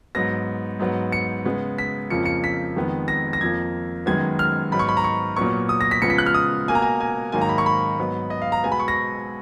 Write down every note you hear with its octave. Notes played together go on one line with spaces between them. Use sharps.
G#2 F#3 B3 A#6
G#2 F#3 B3
C#7
C#3 G#3 B3
B6
F2 C#3 F3 A#3 C#7
C#7
B6
F2 D#3 G#3 B3
A#6
A#6
F2 F3 A#3 G#6
F#2 D#3 G#3 B3 G#6
F6
G#2 F#3 B3 B5
C#6
B5
A#5
C#6
A#2 F#3 B3 C#6
D#6
A#6
B6
C#3 F3 G#3 B3 C#7
B6
F#6
F6
D#6
B2 A#3 G#5
A#5
G#5
G#5
G#2 D#3 F#3 A#3 G#5
A#5
B5
C#6
B5
G#2 F#3 B3
D#5
F5
A#5
B2 G#3 B3 G#5
B5
C#6
A#6